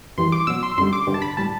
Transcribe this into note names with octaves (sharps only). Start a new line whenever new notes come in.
F#2 E3 G3 C6
D6
B2 F#3 E6
C6
F#2 D3 G3 C6
D6
G2 D3 G3
A5
B5
A2 G3 A5